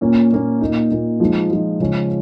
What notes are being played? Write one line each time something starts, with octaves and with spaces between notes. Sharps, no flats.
A#2 A#3 C#4
A#2 A#3 C#4
A#2 A#3 D#4
A#2 A#3 D#4
F3 G#3 D#4
F3 G#3 D#4
C#3 F3 G#3 C#4